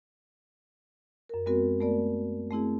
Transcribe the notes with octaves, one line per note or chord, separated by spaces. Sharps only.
F#2 A#4
G#3 B3 C4 F#4 A#4
A3 B3 A#4 D5
A3 C4 E4 G#4